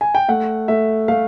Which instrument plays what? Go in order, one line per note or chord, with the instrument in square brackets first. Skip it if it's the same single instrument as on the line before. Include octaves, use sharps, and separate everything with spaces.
[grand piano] G#5
G5
A3 F#5
A3 E5
A3 F5